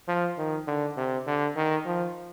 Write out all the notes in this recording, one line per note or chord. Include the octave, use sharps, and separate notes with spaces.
F3
D#3
D3
C3
D3
D#3
F3